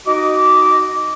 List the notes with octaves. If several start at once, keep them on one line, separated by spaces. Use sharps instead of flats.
D#4 F#4 D#5 D6